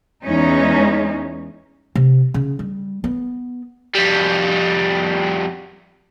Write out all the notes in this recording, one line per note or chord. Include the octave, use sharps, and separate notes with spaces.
E2 G#3 C#4 D#4
C3
C#3
G3
B3
F2 G3